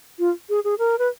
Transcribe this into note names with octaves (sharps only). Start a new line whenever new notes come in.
F4
G#4
G#4
A#4
B4